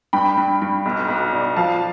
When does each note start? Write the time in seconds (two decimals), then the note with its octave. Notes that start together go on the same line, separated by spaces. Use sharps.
0.13 G2 G5 B5
0.37 G2
0.62 G2
0.86 B1
1.08 B1
1.33 D4
1.56 F3 F5 A5